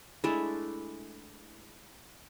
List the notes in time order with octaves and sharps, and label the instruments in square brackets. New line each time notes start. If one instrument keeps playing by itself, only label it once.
[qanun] G#3 A3 D4 E4